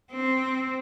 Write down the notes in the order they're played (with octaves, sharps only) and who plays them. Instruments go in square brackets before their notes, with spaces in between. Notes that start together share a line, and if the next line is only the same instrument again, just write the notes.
[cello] C4